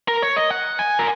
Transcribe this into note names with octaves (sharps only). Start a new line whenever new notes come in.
A#4
C#5
D#5
F#5
G#5
A#4